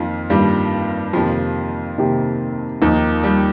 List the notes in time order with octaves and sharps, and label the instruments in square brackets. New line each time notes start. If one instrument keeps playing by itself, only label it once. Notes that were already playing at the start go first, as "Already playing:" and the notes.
Already playing: [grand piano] F2 F3 [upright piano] D#3 A#3 F4
[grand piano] G2 G3 [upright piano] D#3 A#3 F4
[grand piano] F2 F3 [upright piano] C3 D#3 A#3 G4 C5
[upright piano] C3 D#3 A#3 G4 C5
[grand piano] D#2 D#3 [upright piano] F3 A#3 D#4
[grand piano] G3